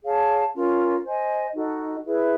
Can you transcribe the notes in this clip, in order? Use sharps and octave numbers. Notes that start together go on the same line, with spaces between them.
G#4 C#5 F5 A5
C#4 F4 A#4
C5 D#5 G#5
D#4 F#4 A4
E4 G#4 B4 E5